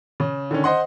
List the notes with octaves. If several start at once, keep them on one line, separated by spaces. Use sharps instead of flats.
C#3
D3 D#3 C#4
C5 D#5 F#5 C6